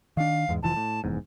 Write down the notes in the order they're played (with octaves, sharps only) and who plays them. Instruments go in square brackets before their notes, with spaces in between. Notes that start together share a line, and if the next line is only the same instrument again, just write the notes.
[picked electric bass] D#3 D4 [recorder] F5
[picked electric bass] E2 G#2 G#3
[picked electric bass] F1 E3 F3 [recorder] A5
[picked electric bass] A2
F1 E2 G#2